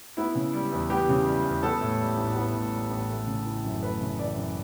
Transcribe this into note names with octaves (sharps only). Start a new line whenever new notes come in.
B3 E4
C#3
G3
E2
B3 G4
C#3
G3
E2
B3 A4
A2
G3
A1
B3
A2
G3
A1
A3
C#3
E3
F#2
A3 B4
C#3
E3 D5
F#2